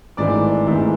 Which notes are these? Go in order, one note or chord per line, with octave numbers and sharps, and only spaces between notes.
G#1 G#2 E3 A3 D5 D6
G#1 G#2 E3 A3